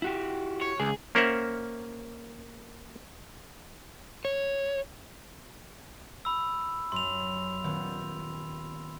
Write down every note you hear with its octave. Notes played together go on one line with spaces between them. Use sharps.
E4 F#4 G4
C#5
C#2 G#4
A#3 C#4 A#4 C5 E5 F#5
C#5
B5 E6
F#2 C6 F7
D#1 B3 G6